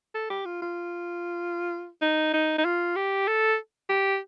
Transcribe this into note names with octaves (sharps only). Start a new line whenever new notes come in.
A4
G4
F4
F4
D#4
D#4
D#4
F4
G4
A4
G4